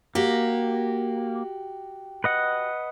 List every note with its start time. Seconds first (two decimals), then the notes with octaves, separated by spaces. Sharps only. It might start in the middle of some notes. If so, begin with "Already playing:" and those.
0.15 A#3 F#4 G4
2.24 B4 D#5 F#5